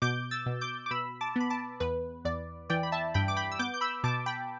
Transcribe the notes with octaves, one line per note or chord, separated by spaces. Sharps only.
B2 D6 G6
E6 A6
B2
D6 G6
D6
B2 B5 E6
A5 D6
B3 B5
A5 D6
E2 B4
E2 D5
E3 D5 G5
B5
E5 A5
G2 G5 B5
D6
G5 B5
E6
B3 D6 G6
G6
B5 E6
B2 A5 D6
G5 B5